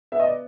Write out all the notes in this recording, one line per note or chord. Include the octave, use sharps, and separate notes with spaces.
B3 E5
D#5
D5